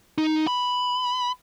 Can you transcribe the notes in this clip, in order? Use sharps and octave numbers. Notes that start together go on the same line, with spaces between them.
D#4
B5